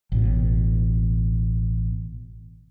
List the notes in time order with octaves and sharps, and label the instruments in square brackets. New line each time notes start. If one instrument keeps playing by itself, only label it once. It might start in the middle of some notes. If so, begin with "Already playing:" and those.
[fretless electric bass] A1 B2